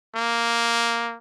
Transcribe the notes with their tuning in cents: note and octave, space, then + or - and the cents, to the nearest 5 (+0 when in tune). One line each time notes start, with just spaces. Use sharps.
A#3 +0